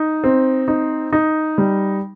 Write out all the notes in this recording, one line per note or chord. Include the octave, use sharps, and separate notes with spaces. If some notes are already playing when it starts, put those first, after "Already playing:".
Already playing: D#4
C4
D#4
D#4
G3